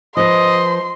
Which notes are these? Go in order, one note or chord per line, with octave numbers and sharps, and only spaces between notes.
F3 B4 D#5 C6